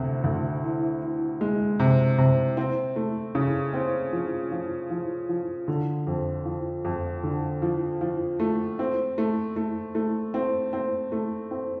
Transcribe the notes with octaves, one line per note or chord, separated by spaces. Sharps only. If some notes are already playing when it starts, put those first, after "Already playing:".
Already playing: D2 C3
D2
E3
E3
G#3
C3
C3
C4
A3
C#3
C4
F3
F3
F3
F3
D3
F2
F3
F2
D3
F3
F3
A3
C4
A3
A3
A3
C4
C4
A3
C4